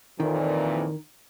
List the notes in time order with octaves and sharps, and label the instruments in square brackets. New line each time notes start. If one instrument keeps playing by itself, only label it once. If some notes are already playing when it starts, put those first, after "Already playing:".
[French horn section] F2 A#2 E3 [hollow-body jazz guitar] D#3